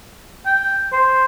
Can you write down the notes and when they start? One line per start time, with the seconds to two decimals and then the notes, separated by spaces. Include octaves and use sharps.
0.46 G5
0.92 C5